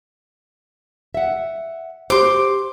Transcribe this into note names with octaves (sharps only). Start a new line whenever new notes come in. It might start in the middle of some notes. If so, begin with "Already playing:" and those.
E5 F#5
F#4 G4 C5 C6 D6